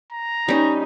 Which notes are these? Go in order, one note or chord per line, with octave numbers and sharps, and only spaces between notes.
A#5
G3 C#4 D#4